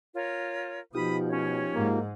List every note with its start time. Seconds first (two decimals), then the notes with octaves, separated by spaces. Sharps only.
0.14 F4 A#4 C#5
0.95 B2 F3 D#4 F4 G4 B5 D#6
1.29 C#4 C#5
1.74 G#2 G#3 A#3